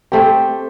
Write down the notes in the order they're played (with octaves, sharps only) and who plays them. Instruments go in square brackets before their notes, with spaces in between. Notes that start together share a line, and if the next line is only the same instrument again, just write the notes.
[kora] A3 C4 G4 [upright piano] G5